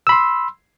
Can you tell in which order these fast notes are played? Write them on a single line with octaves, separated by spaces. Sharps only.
E6 B5 C6